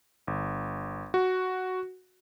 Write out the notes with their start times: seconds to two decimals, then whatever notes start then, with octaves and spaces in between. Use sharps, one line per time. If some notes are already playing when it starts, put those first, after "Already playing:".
0.27 G1
1.14 F#4